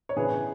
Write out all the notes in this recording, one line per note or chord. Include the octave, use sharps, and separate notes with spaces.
C#5
C#3 E3 B3 D4 G#4 B4